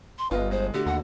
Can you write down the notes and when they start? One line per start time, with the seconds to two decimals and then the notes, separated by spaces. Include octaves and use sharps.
0.18 C6
0.31 G1 F4 B4 D#5
0.51 G#3 C5
0.74 D3 A3 F#4 G4
0.86 D#2 F#5